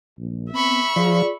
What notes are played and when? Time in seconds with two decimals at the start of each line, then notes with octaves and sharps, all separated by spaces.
0.17 A#1
0.53 B3 C4 E5 B5 C#6
0.96 F3 F4 G#4 D5